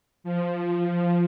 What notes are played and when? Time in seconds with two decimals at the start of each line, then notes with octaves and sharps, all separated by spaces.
0.24 F3